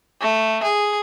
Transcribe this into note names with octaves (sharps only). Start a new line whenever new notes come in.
A3
G#4